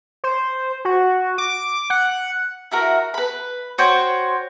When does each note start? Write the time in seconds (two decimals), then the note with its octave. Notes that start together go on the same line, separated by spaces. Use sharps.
0.24 C5
0.85 F#4
1.38 D6
1.90 F#5
2.71 E4 F#4 A#4
3.14 B4 B5
3.78 F#4 C5 C#5 G5